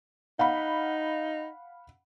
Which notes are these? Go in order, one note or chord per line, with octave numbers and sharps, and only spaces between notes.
D#4 F5 F#5 B5